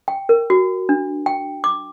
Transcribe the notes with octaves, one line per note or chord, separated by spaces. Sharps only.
G5
A#4
F#4
D4
G5
D6